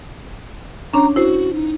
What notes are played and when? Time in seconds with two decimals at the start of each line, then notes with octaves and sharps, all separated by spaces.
0.94 C#4 D4 C#5 A#5
1.16 E4 F#4 C5
1.54 D#4